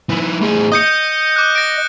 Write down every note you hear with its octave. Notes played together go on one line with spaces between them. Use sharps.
F3 E4
A2 G#4
D#5 D#6 G6 C#7
D6 F#6
A#6 D7